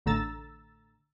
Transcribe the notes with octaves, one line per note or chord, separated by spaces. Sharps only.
A1 D3 A3 A#5 E6 A6